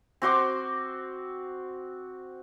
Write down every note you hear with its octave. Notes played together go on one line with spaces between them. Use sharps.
C4 F#4 C6 D6